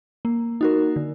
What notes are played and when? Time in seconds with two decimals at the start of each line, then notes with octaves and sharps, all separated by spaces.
0.25 A#3
0.61 D#4 F#4 A#4
0.96 D3